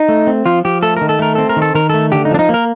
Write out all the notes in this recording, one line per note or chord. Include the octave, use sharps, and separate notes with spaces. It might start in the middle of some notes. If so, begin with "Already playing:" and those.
Already playing: D#4
A3
C4
F3 F4
F3 G4
A3 A4
D#3 A#4
A4
A3 A#4
C4 A4
A#4
D#3
A4
D#3 A#4
A3 A4
D3 G4
D#4
F3 D4
D#4
A#3 A#4